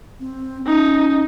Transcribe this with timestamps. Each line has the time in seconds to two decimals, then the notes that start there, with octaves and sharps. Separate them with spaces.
0.20 C4
0.66 C#4 D#4